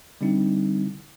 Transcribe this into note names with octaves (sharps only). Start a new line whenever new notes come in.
D3 G3 C4 D#4 E4